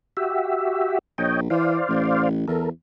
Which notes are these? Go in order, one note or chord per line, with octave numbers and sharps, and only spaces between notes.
F#4 G4 E5
A#1 C#5 D#5 G5
E3 C5 D5 F5
A1
E2 A4 A#4